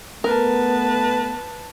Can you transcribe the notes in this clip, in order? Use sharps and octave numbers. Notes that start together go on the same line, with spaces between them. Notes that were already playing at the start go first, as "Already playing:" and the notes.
A3 B3 A#4 B4 A5